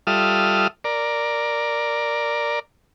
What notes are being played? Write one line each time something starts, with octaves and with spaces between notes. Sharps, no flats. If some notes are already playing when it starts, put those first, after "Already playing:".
G3 F4 A4 E5 D#6 F6
A#4 D5